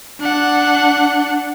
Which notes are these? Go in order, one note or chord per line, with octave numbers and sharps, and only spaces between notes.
D4 F#5